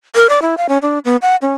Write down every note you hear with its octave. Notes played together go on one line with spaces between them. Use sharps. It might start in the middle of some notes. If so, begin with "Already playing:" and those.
A#4
D5
E4
F5
C#4
D4
B3
F#5
C#4